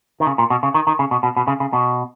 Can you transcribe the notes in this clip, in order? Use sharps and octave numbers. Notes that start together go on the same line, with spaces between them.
D#3
C#3
A#2
B2
C#3
D#3
D#3
C#3
B2
B2
B2
C#3
C#3
B2